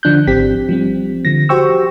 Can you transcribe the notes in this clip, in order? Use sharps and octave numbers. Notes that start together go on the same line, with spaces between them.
D3 F3 D4 F#6 G6
G#1 C4 G4 B6
F3 G3 C4
D3 F3 A#6
F#4 G4 C5 G5 C#6 E6